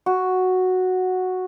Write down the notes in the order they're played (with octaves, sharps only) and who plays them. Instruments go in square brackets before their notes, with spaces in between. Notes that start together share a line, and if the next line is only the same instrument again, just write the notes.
[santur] F#4